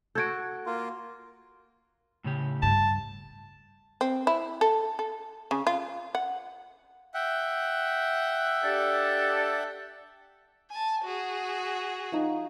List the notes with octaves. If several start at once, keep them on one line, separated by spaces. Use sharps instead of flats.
F#4 A4 G6 G#6 D7
A#3 F4
A2 C#3 G4
G2 A5
C4
E4
A4
A4
C#3
F4
F#5
E5 F#5 G5
D4 G4 A4
G#5 A5
F#4 G#4
F3 D#4